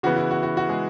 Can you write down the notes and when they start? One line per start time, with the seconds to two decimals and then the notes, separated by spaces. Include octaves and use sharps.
0.03 C#3 E3 B3 F#4
0.16 E4
0.31 F#4
0.43 F#4
0.57 F#4
0.69 G#3 G#4